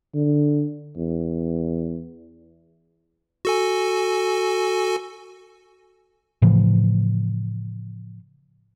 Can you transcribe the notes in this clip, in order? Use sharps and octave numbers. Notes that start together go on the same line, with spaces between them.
D3
E2
F#4 A4 G#5
A2 C#3 E3 F3